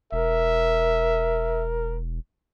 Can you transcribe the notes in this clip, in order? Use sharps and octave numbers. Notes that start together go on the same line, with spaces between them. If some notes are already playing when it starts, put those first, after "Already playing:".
E1 A#4 E5